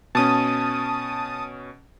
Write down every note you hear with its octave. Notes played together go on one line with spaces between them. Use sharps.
B2 C#4 A5 D#6